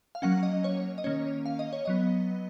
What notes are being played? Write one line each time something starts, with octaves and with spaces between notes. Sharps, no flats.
F5
F#3 A#3 C#4 F#5
D#5
C#5
D#5
D#3 A#3 C#4 C#5
F5
D#5
C#5
F#3 B3 D#5